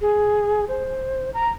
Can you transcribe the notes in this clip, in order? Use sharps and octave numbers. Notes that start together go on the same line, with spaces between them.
G#4
C5
A#5